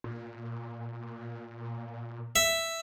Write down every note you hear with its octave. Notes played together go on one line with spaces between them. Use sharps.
A#2
E5